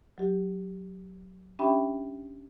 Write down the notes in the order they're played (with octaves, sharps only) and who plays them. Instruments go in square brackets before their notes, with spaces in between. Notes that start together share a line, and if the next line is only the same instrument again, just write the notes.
[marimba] F#3 G4
C#4 D4 G4 E5 G5 B5